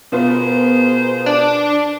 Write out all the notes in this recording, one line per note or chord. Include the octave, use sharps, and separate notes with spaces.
B2 B3 F4 G#4 A#4 C5
D4